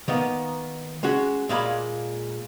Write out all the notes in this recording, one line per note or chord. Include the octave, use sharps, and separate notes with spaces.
D#3 A#3 B3
G#3 C#4 F#4
A#2 G#3 A#3 F5 B5